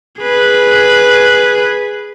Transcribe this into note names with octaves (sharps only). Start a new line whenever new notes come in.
G#4 B4